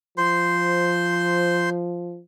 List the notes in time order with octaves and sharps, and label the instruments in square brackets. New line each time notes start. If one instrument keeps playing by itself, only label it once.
[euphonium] F3 [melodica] C5 C6